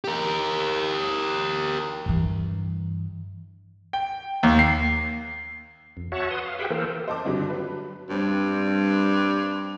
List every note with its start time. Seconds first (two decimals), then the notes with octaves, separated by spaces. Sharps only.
0.04 G4 A#4
2.06 G2 E3
3.93 G5
4.43 D#2
4.59 C7
5.97 F2
6.12 F#4 C#5 E5 F#5 A5
6.31 B4 C6 D#6
6.45 F5
6.59 G4 G#4 B4 E5 F#5 G5
6.70 E3 A#3 A4 A#4 C5
7.08 C5 D#5 A5 D6
7.25 G1 C#2 G2 D3 F#3
7.50 F#3 B4
8.09 G2 G3 C4